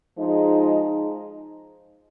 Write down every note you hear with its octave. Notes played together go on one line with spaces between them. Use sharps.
F3 G#3 D#4 G#4